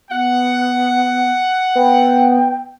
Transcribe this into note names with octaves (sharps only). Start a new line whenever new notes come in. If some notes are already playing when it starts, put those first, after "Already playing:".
B3 F#5
B3 G5